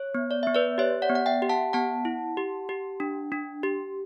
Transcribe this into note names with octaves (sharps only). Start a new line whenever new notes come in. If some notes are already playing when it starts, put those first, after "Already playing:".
Already playing: C#5
B3
D5
B3 E5
B4 D5
G4 C#5 E5
D5 F#5
B3
F#5
E5 G5
G4
F#5 A5
B3 F#5 A5
E4
G4
G4
D4
D4
G4